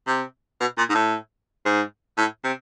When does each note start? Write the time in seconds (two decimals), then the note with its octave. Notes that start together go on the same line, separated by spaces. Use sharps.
0.07 C3
0.60 B2
0.78 A#2
0.90 G#2
0.95 A2
1.65 G#2
2.17 A2
2.44 C3